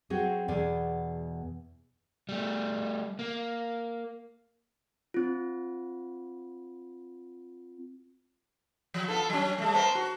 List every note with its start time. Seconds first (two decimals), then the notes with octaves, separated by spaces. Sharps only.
0.10 F#3 C4 F#4 G#4
0.48 E2 B2 G#4 D5
2.29 G3 A3
3.19 A#3
5.14 C4 F4
8.94 F3
9.08 B3 F4 A4
9.30 F#3 C#4
9.58 G3 A3
9.74 B3 A#4 C5
9.95 F#4